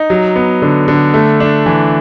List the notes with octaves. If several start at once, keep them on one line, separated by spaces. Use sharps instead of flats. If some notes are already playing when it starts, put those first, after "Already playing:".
Already playing: D#4
F#3
B3
D3
D3
A3
D4
E3